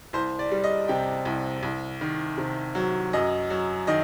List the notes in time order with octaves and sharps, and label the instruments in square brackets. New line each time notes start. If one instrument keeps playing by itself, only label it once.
[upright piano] C2 C5
D5
G3
D#5
C3 G5
C2
C2
D#3
C3
F#3
F#2 D#5
F#3
D#3 D#5